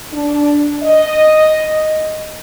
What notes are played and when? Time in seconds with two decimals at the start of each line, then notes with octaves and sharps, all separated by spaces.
0.13 D4
0.83 D#5